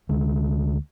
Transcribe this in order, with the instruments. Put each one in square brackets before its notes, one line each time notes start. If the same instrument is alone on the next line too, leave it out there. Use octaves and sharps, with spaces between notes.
[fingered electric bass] D2 G#3